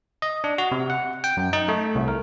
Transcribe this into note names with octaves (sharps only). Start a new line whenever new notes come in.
D#5
D4
F#4
C3
F#5
G5
F#2
D#4
A3
C2
A#4